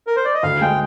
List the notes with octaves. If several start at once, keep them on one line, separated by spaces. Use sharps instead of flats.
A#4
C5
D5
D#5
D2 F5
G#3 G5